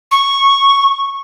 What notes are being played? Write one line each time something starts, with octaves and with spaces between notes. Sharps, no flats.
C#6